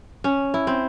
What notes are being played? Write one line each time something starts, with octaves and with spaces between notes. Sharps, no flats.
C#4
E4
C4